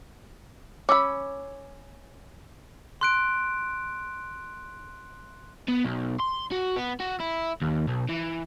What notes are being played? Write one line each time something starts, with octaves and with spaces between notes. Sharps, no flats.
C#4 B5 D6 E6
C6 F#6 D7
B3
B1
C6
F#4
B3
F#4
E4
D#2
B1
E3